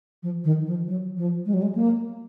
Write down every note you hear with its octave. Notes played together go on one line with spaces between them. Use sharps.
F3
D#3
F3
F#3
F3
G#3
F#3
G#3
A#3